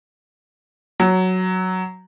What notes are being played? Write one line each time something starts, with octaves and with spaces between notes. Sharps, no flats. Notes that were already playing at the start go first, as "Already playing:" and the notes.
F#3